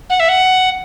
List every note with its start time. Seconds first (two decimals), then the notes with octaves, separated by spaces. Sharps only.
0.10 F#5
0.20 E5
0.29 F#5